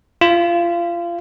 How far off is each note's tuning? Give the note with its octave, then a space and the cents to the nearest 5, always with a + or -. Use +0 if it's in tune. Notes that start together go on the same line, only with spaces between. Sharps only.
F4 -25